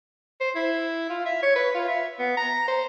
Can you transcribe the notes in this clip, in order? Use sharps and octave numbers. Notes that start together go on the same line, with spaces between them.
C5
E4
F4
E5
C#5
B4
F4
E5
B3
A#5
C5